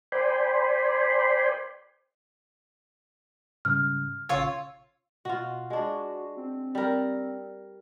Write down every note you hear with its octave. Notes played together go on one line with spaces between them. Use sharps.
C5 D5 G5 G#5 B5 C6
G#2 C#3 G3 F6
A#1 C#3 F4 C#5 E6
B2 F4 F#4
G#3 D4 F#4
C4
G3 A#4